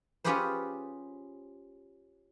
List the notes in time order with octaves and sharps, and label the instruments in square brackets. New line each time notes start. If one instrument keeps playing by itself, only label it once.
[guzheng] C#4 F4 G4 G#4 B4 C5